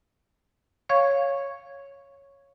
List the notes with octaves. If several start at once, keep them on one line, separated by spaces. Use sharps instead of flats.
C#5 F5 C#6 G#6